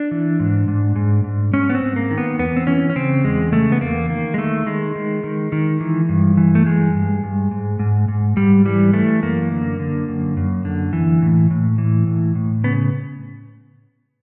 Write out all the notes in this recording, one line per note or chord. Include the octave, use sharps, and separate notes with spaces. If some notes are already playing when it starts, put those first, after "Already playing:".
Already playing: D4
E3
G#2
G#2
G#2
G#2
G#2 C#4
B3
C4
G#2
A#3
D#3
B3
E2 B3
C4
E3 C#4
C#4
C#3 C4
E2 G#3
C#3 A3
B3
E2 A#3
D#3 A#3
G#3
D#3 A3
D#3 G#3
D#3
D#3
D#3
E3
G2
E3
A3
G2 G#3
G2
G2
G#2
G#2
G#2
G#2 G3
E3 G3
E3 A3
F#2 A#3
D3
D3
F#2
F#2
D3
E3
A2
A2
E3
A2
A2
C#3 B3